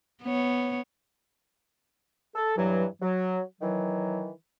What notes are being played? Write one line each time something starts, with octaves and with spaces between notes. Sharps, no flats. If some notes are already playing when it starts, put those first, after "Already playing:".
B3 C#5
A4
G2 E3 F#3
F#3
D#3 E3 F#3